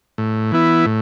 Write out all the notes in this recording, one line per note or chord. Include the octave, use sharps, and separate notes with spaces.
A2
E3 B3 E4
A2